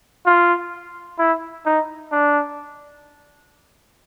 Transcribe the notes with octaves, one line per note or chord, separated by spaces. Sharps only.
F4
E4
D#4
D4